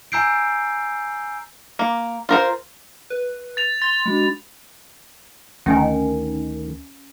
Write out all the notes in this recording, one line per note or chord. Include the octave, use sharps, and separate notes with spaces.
G#5 A#5 E6 G6 C7 D7
A#3
F4 A#4 C5
B4
A6 F7
C6 A6
G#3 D4 F#4 B5
D2 D#3 C#4 G5 G#5